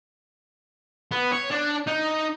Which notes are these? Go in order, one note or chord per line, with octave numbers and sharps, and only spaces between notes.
B3
C#5
D4
D#4